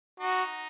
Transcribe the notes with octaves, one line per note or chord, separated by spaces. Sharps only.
D#4 F#4